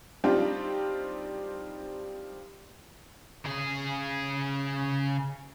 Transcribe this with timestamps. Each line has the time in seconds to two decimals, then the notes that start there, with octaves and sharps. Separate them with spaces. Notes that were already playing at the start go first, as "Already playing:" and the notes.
0.24 G3 C4 D4 D#4 F4 G4
3.46 C#3 G#4